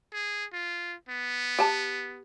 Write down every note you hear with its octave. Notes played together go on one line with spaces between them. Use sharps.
G#4
F4
B3
G4 A5